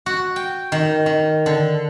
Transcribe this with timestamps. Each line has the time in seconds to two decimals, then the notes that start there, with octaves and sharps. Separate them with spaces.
0.06 F#4
0.36 G5
0.72 D#3
1.06 D#3
1.46 D3